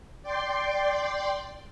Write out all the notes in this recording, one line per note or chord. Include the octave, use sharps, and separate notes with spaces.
D5 G5 C6